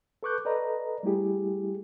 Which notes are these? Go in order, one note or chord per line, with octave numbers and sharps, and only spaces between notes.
A4 B4 C#6 D6 F#6 G6
A4 B4 D5 D#5 A#5
G3 A3 E4 G4 G#4